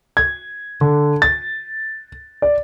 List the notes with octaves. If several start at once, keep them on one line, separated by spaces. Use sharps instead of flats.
G#6
D3
A6
D5